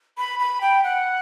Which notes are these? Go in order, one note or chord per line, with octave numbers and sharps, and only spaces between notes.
B5
B5
G5
F#5